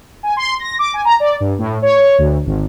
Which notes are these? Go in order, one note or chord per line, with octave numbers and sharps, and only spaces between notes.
G#5
C6
A#6
D6
G#5
A#5
D5
G2
A2
C#5
D2
G#1